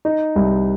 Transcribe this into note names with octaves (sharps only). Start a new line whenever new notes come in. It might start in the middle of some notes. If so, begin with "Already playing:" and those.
D#4
C2